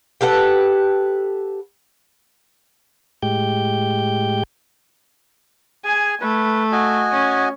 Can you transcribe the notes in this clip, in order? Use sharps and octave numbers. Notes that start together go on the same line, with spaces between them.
G4 A4 B4 F#5
A2 G#3 G4 G5 G6
G#4 G#5
A3 B4
F#4 D#5 G#5
C#4